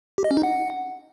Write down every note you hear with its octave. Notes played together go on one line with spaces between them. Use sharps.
G4
D#5
C#4
D#4
F#5